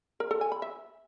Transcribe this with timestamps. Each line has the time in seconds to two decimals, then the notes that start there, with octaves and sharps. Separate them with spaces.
0.20 A#4
0.31 A4
0.41 G#5
0.52 B5
0.62 E5